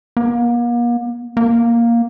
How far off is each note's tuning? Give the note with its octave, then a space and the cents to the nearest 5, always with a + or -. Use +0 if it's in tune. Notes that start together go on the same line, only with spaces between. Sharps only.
A#3 +40
A#3 +5